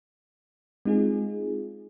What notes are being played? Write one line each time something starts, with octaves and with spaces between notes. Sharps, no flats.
G#3 C4 D#4 F4 G#4